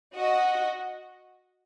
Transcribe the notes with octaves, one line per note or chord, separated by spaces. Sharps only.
F#4 D#5 F#5